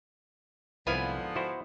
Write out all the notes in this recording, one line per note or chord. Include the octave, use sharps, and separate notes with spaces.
C2 G#2 D3 F3 B3 E4 F5 G#5
E4 F#4 C5